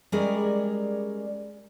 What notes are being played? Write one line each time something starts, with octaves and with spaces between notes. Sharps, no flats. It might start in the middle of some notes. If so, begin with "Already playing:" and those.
G3 G#3 C#4 G#4 A#4 D5